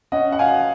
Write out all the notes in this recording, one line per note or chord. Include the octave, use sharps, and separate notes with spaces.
C#4 D#5 F#5
F#5
F5 G#5